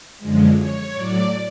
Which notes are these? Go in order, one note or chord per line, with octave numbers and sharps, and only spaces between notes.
F#2 D3 F3 G#3
C#5
A2 F#3 D5